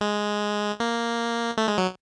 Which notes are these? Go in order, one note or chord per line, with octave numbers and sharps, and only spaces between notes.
G#3
A#3
A3
G#3
F#3